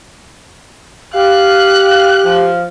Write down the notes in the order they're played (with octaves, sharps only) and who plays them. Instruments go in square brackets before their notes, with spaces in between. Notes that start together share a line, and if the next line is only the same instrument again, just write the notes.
[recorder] G4 [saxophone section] F5 [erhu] F#6
[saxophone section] F3